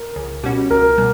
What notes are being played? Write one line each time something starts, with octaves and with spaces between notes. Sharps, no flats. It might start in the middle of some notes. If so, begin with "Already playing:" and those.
Already playing: A#4
C#2
B2 G3 C#4 F#4
C#2 A#4
B2 G3